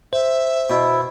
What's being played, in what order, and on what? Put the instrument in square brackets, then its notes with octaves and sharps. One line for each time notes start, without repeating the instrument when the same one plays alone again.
[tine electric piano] C5 [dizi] E5
[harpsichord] B2 [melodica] E4